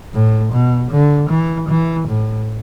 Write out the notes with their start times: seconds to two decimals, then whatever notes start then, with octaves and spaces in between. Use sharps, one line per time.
0.14 A2
0.52 B2
0.91 D3
1.30 E3
1.69 E3
2.08 A2